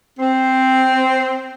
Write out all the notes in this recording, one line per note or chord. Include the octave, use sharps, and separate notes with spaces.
C4